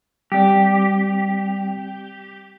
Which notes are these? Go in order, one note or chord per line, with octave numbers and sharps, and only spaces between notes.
G3 C4 G4 D5